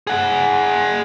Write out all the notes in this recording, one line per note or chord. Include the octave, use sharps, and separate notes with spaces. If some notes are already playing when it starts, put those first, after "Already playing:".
G#4 F#5